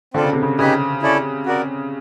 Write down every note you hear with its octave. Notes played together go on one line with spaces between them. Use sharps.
D3 C4 F4 A4 D5
C#3
C3
C#3
C#3 D#4 G4 B4 D#5 G#5
C#4 E4 A4 D5
F#4 A#4 D5